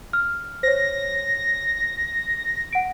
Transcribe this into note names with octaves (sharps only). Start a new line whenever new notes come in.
F6
C5 C#5 A#6
F#5 D7